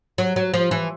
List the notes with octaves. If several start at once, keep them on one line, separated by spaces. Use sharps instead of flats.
F#3
F#3
F3
E3